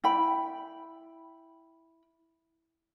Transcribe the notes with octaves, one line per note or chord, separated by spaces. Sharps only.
E4 G5 B5